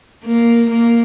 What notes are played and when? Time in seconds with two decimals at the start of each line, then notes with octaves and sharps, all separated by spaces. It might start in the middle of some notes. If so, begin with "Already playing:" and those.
0.25 A#3
0.70 A#3